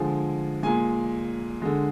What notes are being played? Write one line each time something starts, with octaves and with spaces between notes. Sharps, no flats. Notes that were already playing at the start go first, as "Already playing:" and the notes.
Already playing: D3 F3 G#3 G#5
A#2 G#3 G#5
D3 G#3